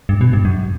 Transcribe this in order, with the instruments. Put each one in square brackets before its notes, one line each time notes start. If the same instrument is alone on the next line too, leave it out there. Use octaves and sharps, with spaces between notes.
[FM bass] G2
B2
G2
F#2